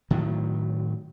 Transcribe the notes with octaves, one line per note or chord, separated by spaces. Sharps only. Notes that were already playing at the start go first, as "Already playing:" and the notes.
A2 D#3 F#3